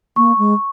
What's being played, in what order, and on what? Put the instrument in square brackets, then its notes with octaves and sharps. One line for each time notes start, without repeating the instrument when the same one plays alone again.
[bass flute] A#3 [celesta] C#6
[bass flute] G#3